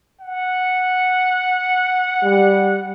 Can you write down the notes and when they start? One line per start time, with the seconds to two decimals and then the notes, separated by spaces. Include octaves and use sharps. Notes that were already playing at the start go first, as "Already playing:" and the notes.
0.20 F#5
2.23 G3